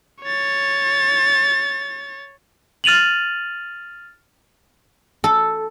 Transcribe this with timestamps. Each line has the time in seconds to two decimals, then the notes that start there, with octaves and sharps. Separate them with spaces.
0.23 C#5 A6
2.84 F6 A6 D#7 F7 F#7
5.24 A4